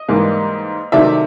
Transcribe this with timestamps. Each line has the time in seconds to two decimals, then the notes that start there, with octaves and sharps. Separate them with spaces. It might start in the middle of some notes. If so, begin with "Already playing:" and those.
Already playing: D#5
0.08 G#2 E3 G3 A#3
0.92 C3 D#3 F#3 A3 D5 E5